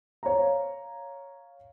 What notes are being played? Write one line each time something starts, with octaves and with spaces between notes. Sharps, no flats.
C#5 F5 A#5